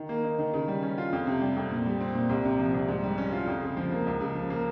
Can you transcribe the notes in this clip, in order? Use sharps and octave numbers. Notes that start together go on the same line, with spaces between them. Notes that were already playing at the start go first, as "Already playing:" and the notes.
Already playing: D#3
A#3
D#4
D#3
C#3
G3
C#4
F4
F2
C3
G3
F2
A#2
G3
C4
A#2
C2
C3
F3
C2
G#2
G3
C#4
F4
F2
C#3
F3
A#3
C#2
C#3
F3
A#3